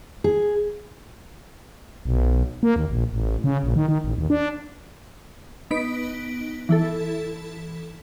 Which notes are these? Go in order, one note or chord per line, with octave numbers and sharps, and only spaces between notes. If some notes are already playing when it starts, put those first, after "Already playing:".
G#4
B1
A#3
D#2
A#1
A1
C#3
A#1
D#3
D#3
A1
D#2
D4
B3 D#4 B6 D7
E3 E4 A4